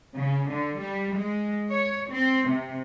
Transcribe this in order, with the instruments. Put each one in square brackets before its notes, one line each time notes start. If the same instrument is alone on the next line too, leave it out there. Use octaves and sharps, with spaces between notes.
[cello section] C#3
D3
G3
G#3
C#5
C4
C3